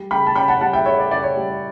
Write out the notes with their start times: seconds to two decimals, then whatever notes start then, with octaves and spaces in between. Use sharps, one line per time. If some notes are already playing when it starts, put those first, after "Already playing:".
Already playing: G3
0.11 C#3 G5 B5
0.27 A5
0.36 C#4 G5 B5
0.48 F#5 A5
0.61 G3 F#5 A5
0.73 E5 G5
0.86 C#3 C#5 E5
0.98 D5
1.11 C#3 D5
1.23 C#5
1.36 G3